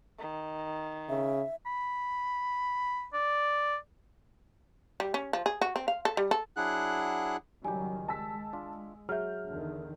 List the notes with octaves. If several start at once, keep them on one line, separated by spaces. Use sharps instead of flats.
D#3
C#3 E5
B5
D5
G3
C#4
F3
G#4
F#4
C4
F5
A4
G3
A4
F#3 D4 E4 G#4 F#5 F#6
C#2 D#3 F#3 G3 G4 G#5
G#3 A5 E6 B6
D4 F4
F#3 G#4 E5 F6 G6
E2 D3 D#3